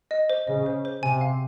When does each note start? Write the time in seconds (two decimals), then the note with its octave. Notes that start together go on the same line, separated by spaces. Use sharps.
0.11 D#5
0.30 C5
0.47 C#3 D#5
0.66 C5
0.85 C5
1.03 C3 G#5
1.21 F5